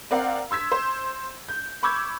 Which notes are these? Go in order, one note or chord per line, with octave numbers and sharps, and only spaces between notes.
C4 A#4 D5 F5 F#5
C6 E6 G#6 B6
C5
G6
B5 C#6 D6 E6 G6 G#6